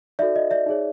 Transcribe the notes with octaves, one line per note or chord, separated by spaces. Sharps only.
D#4 F#4 A4 D5 E5
D#5
D5 E5
D#4 G#4 C#5